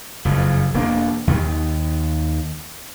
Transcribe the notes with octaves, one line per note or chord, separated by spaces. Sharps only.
F#1 F2
E1 A#3 D4
D#2 D#3